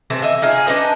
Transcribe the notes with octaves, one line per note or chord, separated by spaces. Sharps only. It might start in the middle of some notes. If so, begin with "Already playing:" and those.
C3 E3 A3 E4
D#5 E5
D#4 F4 G#4 G#5
D4 D#4 B4 D#5